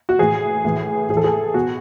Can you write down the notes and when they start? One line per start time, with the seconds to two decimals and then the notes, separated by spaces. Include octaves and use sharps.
0.09 F#4
0.19 A2 E3 G#4
0.65 A2 E3
1.09 A2 G#4
1.14 E3 A4
1.24 G#4
1.54 B2 F#4